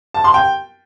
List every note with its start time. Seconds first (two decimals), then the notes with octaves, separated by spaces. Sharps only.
0.14 A5
0.24 C6
0.34 G5